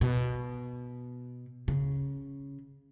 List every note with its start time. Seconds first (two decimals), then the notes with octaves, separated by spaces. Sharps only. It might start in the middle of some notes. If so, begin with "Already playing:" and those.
0.01 B2
1.68 C#3